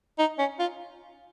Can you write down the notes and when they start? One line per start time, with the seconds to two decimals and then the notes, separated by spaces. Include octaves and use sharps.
0.19 D#4
0.39 C#4
0.59 F4